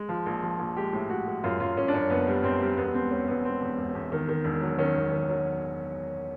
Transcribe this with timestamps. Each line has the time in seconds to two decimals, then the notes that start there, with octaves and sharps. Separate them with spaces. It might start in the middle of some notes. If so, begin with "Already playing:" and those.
Already playing: G#3
0.09 F3
0.26 A#1
0.43 F3
0.59 A#1
0.76 G#3 G4
0.93 A2
1.09 A2 F#4
1.27 G#3
1.44 F#2 F4
1.60 F#2 F4
1.77 F#2 C#4
1.88 D4
1.94 F#2 C#4
2.10 F#1 B3
2.27 G3
2.43 F#2 C4
2.61 G3
2.77 E1 B3
2.94 E1 C4
3.10 E1 C#4
3.27 E1 B3
3.44 E1 C4
3.61 E2
3.78 E1
3.95 E2
4.12 D#3
4.29 D#3
4.44 E1
4.61 F#3
4.78 D#3 C#4
4.95 E1
5.11 D#3
5.29 F#3